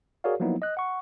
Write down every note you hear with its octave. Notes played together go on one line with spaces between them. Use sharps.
F#4 G#4 A#4 C#5 D5 F5
F3 F#3 A#3 B3 D#4 E4
D#5 F#6
F#5 C#6